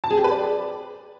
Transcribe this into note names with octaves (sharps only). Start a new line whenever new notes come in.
A5
G#4
G4
B4
D5